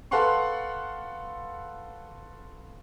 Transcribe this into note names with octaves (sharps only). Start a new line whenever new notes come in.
A4 B4 F5 F#5 C6 C#6